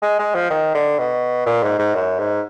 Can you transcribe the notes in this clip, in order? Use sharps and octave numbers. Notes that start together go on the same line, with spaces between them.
G#3
G#3
F3
D#3
D3
B2
A#2
G#2
G#2
F#2
G#2